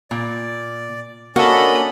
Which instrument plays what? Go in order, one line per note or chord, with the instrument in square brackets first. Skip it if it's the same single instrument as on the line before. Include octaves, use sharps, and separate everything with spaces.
[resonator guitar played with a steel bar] A#2 [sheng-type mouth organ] D5
[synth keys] A#3 A4 [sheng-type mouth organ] C#4 D4 F#5 [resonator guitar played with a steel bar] F#4 [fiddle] D#5 B5